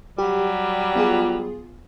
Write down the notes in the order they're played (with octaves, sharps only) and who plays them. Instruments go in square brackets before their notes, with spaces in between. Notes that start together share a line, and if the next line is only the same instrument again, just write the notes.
[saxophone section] F#3 G3 [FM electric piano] G4
[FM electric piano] B3 F4 G#4